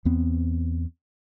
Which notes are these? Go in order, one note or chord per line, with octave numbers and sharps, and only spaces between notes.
E2 B3 C4